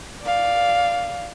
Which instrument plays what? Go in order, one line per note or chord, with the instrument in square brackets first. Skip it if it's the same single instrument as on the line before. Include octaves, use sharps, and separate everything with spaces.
[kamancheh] D5 F5